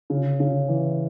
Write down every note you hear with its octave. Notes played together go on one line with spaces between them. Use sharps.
C#3
C#3
E3